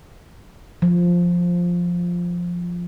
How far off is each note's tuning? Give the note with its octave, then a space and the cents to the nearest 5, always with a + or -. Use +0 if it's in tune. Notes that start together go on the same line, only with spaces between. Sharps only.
F3 +5